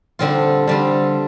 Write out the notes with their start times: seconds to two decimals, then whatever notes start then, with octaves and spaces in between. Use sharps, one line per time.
0.19 D3 G3 C4 F4
0.67 D3 G3 C4 F4